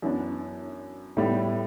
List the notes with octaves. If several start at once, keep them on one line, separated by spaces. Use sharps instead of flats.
F#2 E3 B3 D4
A2 G3 B3